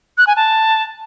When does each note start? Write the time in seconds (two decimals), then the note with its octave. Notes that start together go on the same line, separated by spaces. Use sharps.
0.18 F#6
0.27 G#5
0.36 A5